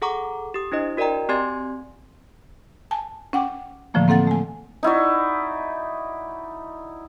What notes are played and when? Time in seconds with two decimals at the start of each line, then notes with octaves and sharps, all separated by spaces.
0.02 G#4 A4 F#5 A#5 C#6 D6
0.54 G4 D#6
0.72 D4 E4 C5 D#5
0.97 F#4 A#4 D5 D#5 G5 A#5
1.29 C4 G4 D5 G#5 C6 G#6
2.91 G#5 A5
3.33 C#4 F#5 G5 D6
3.94 A2 D3 E3 F3 A3 A#3
4.08 A#3 C4 A4 F#5 A6
4.27 A3 G#5
4.83 D#4 E4 F#4 D5